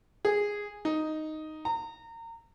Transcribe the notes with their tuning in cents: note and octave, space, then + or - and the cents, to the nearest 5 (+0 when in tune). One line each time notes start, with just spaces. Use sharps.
G#4 -10
D#4 +0
A#5 -30